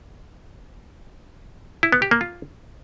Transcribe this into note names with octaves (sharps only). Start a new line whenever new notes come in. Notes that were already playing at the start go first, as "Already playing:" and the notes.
E4
B3
G4
A#3
F4